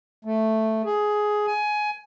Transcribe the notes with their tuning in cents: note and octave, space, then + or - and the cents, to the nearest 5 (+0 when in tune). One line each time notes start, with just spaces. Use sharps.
A3 +0
G#4 +10
G#5 +15